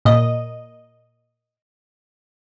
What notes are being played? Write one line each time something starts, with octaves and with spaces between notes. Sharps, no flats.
A#2 D#5